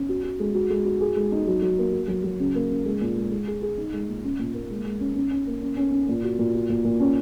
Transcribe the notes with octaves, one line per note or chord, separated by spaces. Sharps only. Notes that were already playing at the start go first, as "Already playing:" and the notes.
Already playing: C#4
F#4
F#4
G#3
F#4
G#3
F#4
G#4
G#3
D#4
F#3
F#3
A#3
F#4
F#3
F#3
C#3
A#3
C#3
G#3
A#2
G#3
G#3
G#4
G#4
D#4
G#3
A#2
C#4
A#2
A#3
G#3
G#3
C#4
C#4
C#4
A#3
C#4
C#4
C#4
A#2
F#4
A#2
F#4
A#2
A#2
C#4